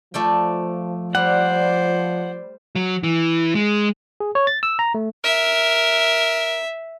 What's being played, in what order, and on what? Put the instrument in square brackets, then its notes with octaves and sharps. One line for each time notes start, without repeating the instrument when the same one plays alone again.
[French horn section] F3 [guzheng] A3 D5 G5
[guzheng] G3 [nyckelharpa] C5 D5 [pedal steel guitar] F#5
[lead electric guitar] F#3
E3
G#3
[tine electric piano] G#4
C#5
A6
E6
A#5
A3
[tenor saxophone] A#4 [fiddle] E5